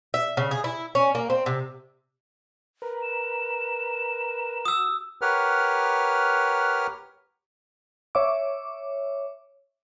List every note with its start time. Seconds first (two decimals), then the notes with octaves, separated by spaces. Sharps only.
0.14 E5
0.37 C#3
0.51 G#4
0.64 E4
0.95 C#4
1.15 A#3
1.30 C4
1.46 C3
2.82 A#4 B4
3.02 E7
4.65 F#4 D#6 E6
5.22 G4 A#4 B4 C#5 F#5 F6
8.15 C#5 E5 D6